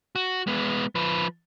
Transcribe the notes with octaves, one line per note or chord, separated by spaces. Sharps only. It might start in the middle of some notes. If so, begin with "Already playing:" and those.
F#4
G#3 B3
F3 B4